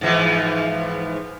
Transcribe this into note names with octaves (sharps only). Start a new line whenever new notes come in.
G#2 E3 F3